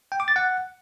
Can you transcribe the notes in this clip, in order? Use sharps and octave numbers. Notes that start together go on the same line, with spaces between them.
G5
D6
A6
F#5